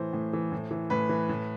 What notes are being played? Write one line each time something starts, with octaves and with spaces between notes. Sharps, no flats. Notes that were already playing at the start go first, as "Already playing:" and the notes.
Already playing: A2 E3 C5
A2
E3
A2
E3
A2 B4
E3
A2